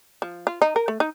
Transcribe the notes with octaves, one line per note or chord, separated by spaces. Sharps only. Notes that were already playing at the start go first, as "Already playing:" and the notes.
F3
F4
D#4
A#4
A3
D#4